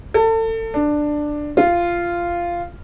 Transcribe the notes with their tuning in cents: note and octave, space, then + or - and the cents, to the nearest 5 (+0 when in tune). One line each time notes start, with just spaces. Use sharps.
A4 +30
D4 +10
F4 -10